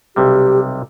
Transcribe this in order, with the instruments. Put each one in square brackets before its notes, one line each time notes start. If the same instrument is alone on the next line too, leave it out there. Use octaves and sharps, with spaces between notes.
[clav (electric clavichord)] B1 C3 G3 [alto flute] G4